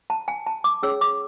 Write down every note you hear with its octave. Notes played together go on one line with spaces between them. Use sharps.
A5
G#5
A5
D6
C#4 G#4 C#5 E6
D6